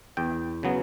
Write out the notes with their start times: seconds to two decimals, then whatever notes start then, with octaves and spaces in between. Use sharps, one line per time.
0.17 E2 G5
0.63 C#3 F#3 B3